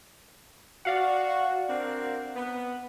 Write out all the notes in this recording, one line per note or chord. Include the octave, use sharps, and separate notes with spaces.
F#4 D5 F5 F#5
C4 D4 A#4
B3